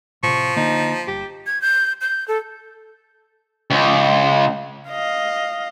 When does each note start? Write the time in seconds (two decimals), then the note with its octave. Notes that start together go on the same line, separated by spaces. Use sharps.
0.23 A2 C3 F3 C#6
0.56 D3 A#3 D#4
1.07 G1 G4
1.46 G#6
1.62 G6
2.01 G6
2.28 A4
3.70 C#2
4.89 D#5 F5